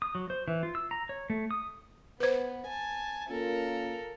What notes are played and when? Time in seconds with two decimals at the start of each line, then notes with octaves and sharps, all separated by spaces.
0.02 D#6
0.15 F#3
0.30 C5
0.48 E3
0.63 F4
0.75 E6
0.91 A#5
1.09 C#5
1.30 A3
1.51 D#6
2.20 B3 B4 C5
2.67 G#5 A5
3.29 A#3 C#4 F4 A4 A#4